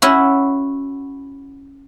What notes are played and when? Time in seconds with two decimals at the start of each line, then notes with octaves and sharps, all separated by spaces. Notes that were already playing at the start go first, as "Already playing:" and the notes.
0.02 C#4 E4 F#4